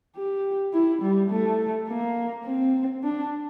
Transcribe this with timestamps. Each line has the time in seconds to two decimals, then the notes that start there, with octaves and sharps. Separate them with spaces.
0.16 G4
0.73 E4
1.02 G3
1.30 A3
1.88 A#3
2.45 C4
3.03 D4